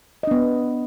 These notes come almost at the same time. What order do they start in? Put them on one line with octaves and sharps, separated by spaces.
D#5 D4 B3